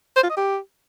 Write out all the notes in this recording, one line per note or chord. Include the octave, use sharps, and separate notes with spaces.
C5
F4
D#5
G4